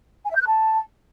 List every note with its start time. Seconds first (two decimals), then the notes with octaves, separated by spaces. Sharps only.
0.24 G#5
0.30 E5
0.36 G6
0.41 F#6
0.47 A5